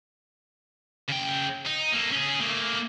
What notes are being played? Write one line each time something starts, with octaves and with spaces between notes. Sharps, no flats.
C#3 G5
D#4
A#3 A4
C#4 G#4
A3 A#3